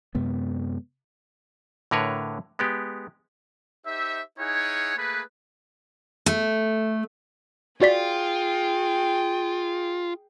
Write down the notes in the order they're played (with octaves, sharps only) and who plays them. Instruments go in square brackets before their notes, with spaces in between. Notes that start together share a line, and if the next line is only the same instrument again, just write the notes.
[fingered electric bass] F#2 C3 G#3 B3
[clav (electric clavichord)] A2 D3 A#4 B4 C#5
G#3 B3 G4
[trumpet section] D#4 G4 C5 E5
D#4 E4 G#4 C#5 F#5 G#5
A3 A#3 G#4 B4
[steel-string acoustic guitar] A3
[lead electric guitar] F4 [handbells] F#4 D5 B6 [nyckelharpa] G#4 G5